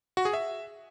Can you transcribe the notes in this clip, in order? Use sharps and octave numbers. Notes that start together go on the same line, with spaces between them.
F#4
G#4
E5